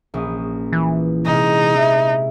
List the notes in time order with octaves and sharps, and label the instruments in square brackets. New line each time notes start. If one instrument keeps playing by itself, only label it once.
[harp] A#1 C#4 D#6
[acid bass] E3
[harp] C3 G#3 [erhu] D#4
[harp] E4